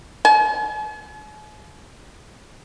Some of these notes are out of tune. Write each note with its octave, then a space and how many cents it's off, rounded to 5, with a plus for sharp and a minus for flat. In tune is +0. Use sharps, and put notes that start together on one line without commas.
G#5 +45